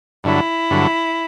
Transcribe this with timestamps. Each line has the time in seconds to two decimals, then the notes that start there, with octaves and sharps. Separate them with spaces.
0.24 G2 D3 F#3 E4
0.70 G2 D3 F#3